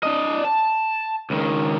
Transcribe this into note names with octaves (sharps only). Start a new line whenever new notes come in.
D4 D#5
A5
C#2 D#3